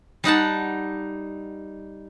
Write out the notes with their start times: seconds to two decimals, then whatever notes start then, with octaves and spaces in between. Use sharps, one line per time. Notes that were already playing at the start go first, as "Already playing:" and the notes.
0.24 G3 D#4 F#5 A5